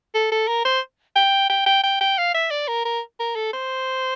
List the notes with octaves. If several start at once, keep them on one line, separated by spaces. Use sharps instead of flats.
A4
A4
A#4
C5
G5
G5
G5
G5
G5
F5
E5
D5
A#4
A#4
A#4
A4
C5